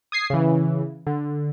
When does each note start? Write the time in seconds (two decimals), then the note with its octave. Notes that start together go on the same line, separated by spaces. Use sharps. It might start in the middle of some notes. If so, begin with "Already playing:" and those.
0.12 D#6 G#6 C7
0.30 C#3 E3
1.07 D3